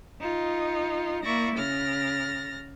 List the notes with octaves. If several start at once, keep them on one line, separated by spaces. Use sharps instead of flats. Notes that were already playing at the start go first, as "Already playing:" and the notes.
D#4 F4
A#3 E4 D5 C#6 A#6
C#3 F6 A6 A#6